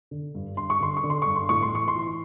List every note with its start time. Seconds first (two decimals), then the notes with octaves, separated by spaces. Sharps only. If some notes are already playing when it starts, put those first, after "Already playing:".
0.11 D3
0.35 G2
0.57 G2 C6
0.70 C#6
0.80 D3 C6
0.97 C#6
1.04 D3
1.10 C6
1.22 G2 C#6
1.36 C6
1.49 A2 C#6
1.62 C6
1.72 E3 C#6
1.88 C6
1.95 E3